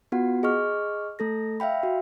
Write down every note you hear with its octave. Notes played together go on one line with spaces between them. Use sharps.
B3 F4 F#4 F#5
G#4 D#5 C#6 F6
A3 A4 A#6
E5 F5 G5 B5
F#4